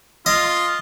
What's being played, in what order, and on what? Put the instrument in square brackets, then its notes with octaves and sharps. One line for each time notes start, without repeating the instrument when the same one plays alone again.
[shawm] F4 [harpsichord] D#5